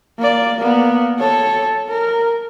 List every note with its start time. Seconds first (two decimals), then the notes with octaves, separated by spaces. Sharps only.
0.18 A#3 D5
0.56 A#3 B3
1.19 A4 C#5
1.89 A#4